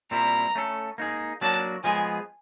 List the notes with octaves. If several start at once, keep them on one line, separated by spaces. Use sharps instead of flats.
A#2 G3 C4 E4 A#5
A3 C#4 E4 A4
A#3 D#4 G#4
F#3 A#3 D4 F#4 A5
F3 G#3 B3 E4 G#4 G#5